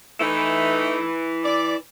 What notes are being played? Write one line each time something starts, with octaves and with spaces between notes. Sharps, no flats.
E3 A3 D#4 E4 B4
D5